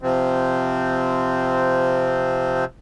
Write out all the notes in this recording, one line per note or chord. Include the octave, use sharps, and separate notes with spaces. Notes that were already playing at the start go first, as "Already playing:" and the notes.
C3 F3 C4